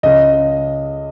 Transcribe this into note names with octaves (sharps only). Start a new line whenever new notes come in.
C#2 C#3 D#5